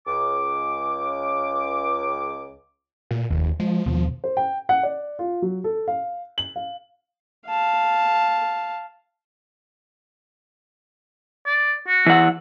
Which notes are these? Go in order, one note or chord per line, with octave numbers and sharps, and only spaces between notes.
C#2 D6
A#2
F1 D#2
F3 G#3
D#2 B2
C5
G5
F#5
D5
F4
F#3
A4
F5
F#7
F5
F5 A5
D5
F#4
E3 F#5